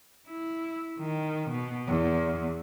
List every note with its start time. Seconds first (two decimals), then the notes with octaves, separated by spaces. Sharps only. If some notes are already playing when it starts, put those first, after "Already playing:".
0.28 E4
0.99 D#3
1.51 B2
1.88 E2